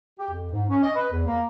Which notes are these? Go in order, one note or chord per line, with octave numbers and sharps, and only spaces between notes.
G4
F2
G#2
C#4
D#5
B4
E2
A#3